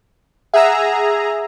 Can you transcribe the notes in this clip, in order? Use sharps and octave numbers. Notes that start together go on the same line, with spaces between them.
G#4 E5 F#5 A#5 E6